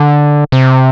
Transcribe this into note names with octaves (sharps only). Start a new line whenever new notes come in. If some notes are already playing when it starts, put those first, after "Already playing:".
Already playing: D3
C3